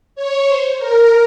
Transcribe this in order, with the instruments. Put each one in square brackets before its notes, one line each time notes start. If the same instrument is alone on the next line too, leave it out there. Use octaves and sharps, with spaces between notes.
[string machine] C#5
C5
A#4